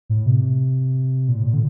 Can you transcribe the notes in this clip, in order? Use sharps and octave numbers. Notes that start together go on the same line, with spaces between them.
A2
C3
A#2
A2
A#2
D3